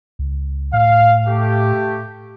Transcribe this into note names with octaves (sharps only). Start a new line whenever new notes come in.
C#2
A2 F5
A3 G4